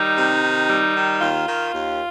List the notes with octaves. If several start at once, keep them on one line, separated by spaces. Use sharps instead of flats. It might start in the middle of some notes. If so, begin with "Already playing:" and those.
Already playing: D#3 G3 D#4
C3
D#3
G3
D#3
D#2 F4
D#3
D#2